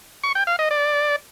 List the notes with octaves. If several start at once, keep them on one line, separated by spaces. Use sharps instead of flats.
C#6
G5
F5
D#5
D5